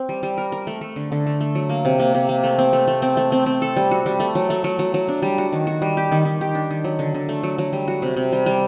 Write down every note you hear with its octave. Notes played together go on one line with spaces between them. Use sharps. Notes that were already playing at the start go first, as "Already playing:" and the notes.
Already playing: C4
G3
G3
A#4
A#4
A3
A3
D3
D3
A3
A3
F#3
A#3
C3
A#3
C3
A#3
A3
C4
A3
A3
C4
A3
C4
C4
A4
G3
F#4
G3
A3
F#3
A3
F#3
F#3
F#3
D4
G3
F#4
D#3
F#4
G3
G4
D#3
D#3
G4
D4
D#3
F#3
D3
D3
A3
F#3
F#3
G3
F#4
C3
C3
G3
G3